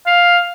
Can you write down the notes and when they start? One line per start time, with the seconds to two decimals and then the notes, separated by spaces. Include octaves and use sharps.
0.06 F5